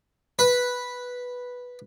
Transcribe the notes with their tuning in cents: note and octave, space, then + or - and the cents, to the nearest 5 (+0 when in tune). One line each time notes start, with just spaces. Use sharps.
B4 -5